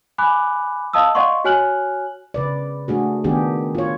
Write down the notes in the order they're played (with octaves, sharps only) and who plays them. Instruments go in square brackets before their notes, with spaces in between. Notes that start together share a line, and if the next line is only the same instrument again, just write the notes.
[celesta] G#5 B5 D6 F#6
D#5 F5 A5 D#6 E6
D5 D#5 F5 F#5 C6 C#6
F#4 C#5 G#5 F6 F#6 F#7
[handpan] C#3 B4 D5
A3 D4 F#4 G#4
D#3 B3 D4 G4 G#4
F4 C#5